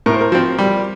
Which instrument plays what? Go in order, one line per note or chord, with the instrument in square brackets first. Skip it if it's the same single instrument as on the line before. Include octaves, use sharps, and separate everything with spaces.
[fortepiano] A2 [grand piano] A#4
[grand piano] C5
A#4
[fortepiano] F3 C4
G3